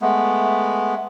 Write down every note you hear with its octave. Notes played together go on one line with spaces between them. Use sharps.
G#3 A3 B3